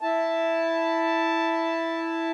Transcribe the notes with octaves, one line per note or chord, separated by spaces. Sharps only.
E4 A5